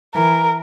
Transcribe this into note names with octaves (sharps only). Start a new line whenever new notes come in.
E3 A#4